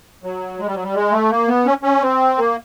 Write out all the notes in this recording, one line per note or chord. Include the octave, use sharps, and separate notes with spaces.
F#3
G#3
G3
F#3
G3
G#3
A3
A#3
B3
C#4
C#4
C4
A#3